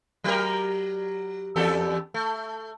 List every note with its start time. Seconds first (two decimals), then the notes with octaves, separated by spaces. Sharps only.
0.24 F#3 G4 A#4
1.56 E2 G4 A4
2.14 A3